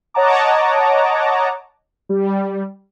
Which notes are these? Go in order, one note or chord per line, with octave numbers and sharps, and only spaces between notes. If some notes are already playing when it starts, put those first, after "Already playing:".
C#5 D#5 F#5 A5 A#5 D6
G3